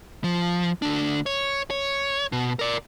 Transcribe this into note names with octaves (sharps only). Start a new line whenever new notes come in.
F3
D2 D4
C#5
C#5
B2
A#4 D5